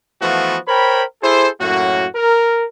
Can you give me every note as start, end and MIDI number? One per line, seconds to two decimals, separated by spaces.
0.22 0.57 52
0.22 0.57 53
0.22 0.57 57
0.22 0.57 59
0.22 0.57 65
0.22 0.57 66
0.68 1.03 70
0.68 1.03 72
0.68 1.03 73
0.68 1.03 79
0.68 1.03 83
1.23 1.49 64
1.23 1.49 68
1.23 1.49 69
1.23 1.49 72
1.61 2.07 42
1.61 2.07 45
1.61 2.07 58
1.61 2.07 66
2.15 2.65 70